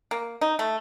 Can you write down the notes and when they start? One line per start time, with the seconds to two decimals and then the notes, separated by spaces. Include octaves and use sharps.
0.11 A#3
0.41 D#4
0.59 A3